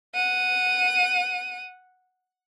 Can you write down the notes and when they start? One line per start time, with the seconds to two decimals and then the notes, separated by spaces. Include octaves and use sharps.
0.15 F#5 D#7